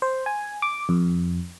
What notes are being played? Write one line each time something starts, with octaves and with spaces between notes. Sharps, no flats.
C5
G#5
D6
F2